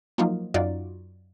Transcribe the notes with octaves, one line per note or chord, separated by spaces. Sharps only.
F3 F#3 A#3 D#4 F4
F#2 D#4 F4 F#4 D5